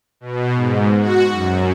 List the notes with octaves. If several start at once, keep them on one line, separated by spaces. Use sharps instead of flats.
B2
G#2
F#4
F#2